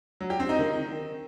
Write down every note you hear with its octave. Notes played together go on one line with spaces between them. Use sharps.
F#3
G4
C4
D#4
D#3